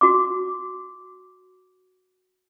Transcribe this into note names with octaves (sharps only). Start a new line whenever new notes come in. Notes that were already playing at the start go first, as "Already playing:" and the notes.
F#4 D6